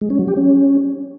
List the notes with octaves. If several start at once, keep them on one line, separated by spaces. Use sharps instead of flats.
G#3
C#4
F#3
G4
C#4